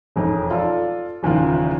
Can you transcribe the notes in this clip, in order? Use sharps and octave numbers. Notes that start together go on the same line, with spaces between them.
E1 F2 D#4
F4 A4 D5
F#1 E2 D#3 F3 F4